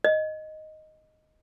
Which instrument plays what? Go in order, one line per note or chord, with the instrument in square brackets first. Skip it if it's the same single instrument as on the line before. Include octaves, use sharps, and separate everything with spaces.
[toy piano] D#5